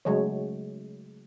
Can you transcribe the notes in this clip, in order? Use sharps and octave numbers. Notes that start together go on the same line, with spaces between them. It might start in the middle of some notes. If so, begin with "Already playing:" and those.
C#3 F#3 G#3 A3 C#5